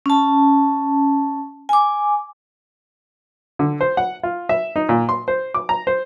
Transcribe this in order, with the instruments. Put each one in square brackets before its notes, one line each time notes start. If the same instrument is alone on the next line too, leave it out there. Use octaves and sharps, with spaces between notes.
[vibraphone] C#4 A5
G#5 D6
[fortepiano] D3
C5
F#5
F4
E5
D#4
A#2
C6
C5
D6
A#5
C5